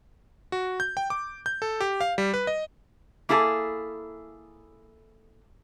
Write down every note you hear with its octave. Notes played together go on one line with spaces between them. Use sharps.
F#4
G6
G5
D6
G6
A4
G4
F5
G3
B4
D#5
A#3 E4 G#4 A4 F5